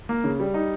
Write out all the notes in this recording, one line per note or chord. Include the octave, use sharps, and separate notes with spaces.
A#3
C#3
G3
D#4